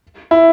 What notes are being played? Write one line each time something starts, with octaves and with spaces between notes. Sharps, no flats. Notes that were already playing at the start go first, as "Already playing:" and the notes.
E4